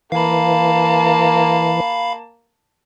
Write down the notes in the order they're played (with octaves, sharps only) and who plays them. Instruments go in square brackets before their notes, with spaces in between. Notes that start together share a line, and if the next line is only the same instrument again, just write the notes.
[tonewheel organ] E3 [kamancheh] A#3 A5 [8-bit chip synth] F5 B5